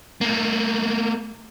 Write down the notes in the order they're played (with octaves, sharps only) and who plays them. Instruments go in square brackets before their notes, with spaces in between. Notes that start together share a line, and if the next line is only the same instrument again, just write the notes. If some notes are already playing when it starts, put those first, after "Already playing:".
[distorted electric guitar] A3 A#3